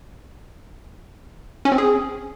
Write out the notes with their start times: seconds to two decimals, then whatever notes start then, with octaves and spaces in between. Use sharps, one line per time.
1.65 C#4
1.72 C4
1.78 G#4